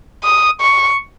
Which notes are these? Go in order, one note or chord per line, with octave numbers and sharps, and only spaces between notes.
D#6
C#6